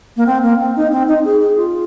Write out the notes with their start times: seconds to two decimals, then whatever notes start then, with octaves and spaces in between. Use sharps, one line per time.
0.16 A#3
0.26 C4
0.42 A#3
0.59 C4
0.76 D#4
0.91 C4
1.08 D#4
1.25 G#4
1.40 G#4
1.57 F4